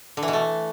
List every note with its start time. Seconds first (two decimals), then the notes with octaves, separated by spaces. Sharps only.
0.17 D3
0.23 E3
0.28 B2
0.33 A3